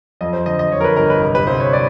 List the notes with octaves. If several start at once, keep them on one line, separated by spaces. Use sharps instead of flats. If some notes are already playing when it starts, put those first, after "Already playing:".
F2 D#5
C5
D3 D#5
D#5
F2 C#5
A#4
B4
G1 A#4
B4
C2
B4
C2 C5
C#5
D5